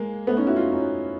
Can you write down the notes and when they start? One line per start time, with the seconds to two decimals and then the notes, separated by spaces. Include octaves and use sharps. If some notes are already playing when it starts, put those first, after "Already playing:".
Already playing: G#3 A#3
0.27 A3 B3
0.37 C#4 D#4
0.47 E4 F#4
0.56 D#4 F4
0.72 C#4 D#4